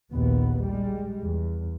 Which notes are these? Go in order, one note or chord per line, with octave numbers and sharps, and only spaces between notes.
A#1 D#2 A#2 B3
G3 G#3
E2